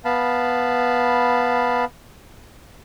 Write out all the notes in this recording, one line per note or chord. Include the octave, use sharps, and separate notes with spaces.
B3 F5 A5 B5